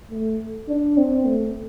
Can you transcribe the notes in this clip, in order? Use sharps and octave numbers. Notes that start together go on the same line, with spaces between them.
A3
D4
C4
A3